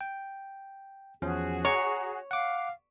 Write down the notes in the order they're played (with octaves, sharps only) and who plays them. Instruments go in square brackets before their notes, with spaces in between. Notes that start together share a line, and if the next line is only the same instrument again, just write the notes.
[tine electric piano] G5
[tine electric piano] E2 F3 C#4 [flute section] F#4 G#4
[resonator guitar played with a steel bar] C#5 [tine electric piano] A#5
[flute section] F5 [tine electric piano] F#5 D6